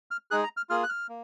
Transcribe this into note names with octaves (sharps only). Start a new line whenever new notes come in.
F6
G#3 D#4 G#4 F#6
A#5
F6
A#3 F4 G#4 F6
F#6
F6
A#3